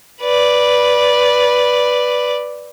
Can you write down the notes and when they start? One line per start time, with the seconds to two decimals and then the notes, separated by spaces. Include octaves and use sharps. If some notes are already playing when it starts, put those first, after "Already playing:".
0.21 B4 D5